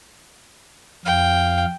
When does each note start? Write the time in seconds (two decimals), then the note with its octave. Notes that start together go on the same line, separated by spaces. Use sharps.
1.05 F2 F5 G5